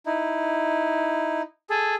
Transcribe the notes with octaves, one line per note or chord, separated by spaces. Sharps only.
D#4 E4
G#4 A4